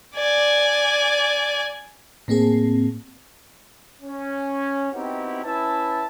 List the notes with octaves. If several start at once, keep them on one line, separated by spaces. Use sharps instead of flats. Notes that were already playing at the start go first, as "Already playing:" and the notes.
D5 G#5
A2 A#3 C4 G#4
C#4
B3 C4 D#4 E4 F#4 G4
C#4 E4 B4 E5 A5